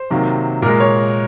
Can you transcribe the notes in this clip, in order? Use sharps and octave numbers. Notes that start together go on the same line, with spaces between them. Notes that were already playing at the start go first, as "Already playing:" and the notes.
Already playing: C5
C3 D#3 F#3 A#3
A#2 G#3 A#4
C#5